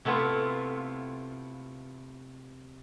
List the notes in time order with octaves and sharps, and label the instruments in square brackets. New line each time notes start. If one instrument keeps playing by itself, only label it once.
[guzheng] C3 A3 B3 E4 F4